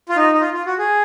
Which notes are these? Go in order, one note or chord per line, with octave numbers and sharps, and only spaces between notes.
F4
D#4
D#4
F4
F4
F#4
G#4